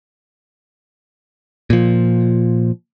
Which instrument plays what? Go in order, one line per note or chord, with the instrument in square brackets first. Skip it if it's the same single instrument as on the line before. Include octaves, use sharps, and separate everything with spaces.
[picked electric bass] A#2 F3